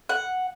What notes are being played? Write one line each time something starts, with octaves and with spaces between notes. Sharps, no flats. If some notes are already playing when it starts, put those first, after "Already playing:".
F#5